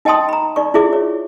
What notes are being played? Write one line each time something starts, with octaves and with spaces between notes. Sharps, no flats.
D#4 D#5 G5 A5 C6 D#6
A#5 B5
D#4 D5 C#6
E4 F4 G#4 E5 D6
C#5